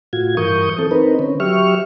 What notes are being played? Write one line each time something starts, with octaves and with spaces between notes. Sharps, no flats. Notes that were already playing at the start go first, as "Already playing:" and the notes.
A2 F4 F#4 G#6
G2 E3 A#4 C#6 D#6 G6
E3 C4 A4
C4 D#4 A#4 B4
D3 C#4
F#3 G4 E5 C#6 F6